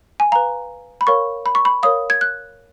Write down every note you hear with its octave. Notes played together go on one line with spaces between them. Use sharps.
G#5
B4 F5 A#5
B5
A#4 C#5 F5 C#6
B5
C#6
B5
A#4 C#5 F5 D#6
G#6
F#6